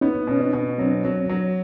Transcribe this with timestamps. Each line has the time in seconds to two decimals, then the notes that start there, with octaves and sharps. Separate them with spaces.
0.01 B3 C#4 D#4
0.27 B2 C#4
0.40 C4 D4
0.53 B2
0.78 F#3 C4 D4
1.05 F#3
1.29 F#3